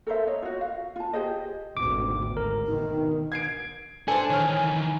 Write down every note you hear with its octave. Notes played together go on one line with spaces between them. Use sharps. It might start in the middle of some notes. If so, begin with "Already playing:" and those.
A4 A#4 C5 E5
C#5 D#5
F4 F#4
F5
F4 A5
G4 G#4 C5 D#5
G#1 D2 B2 D6
G#2 A#4
D2 B2 D#3 D#4
G#6 C7 D7
D4 A4 C5 G#5
D#3 E3 C#5 F6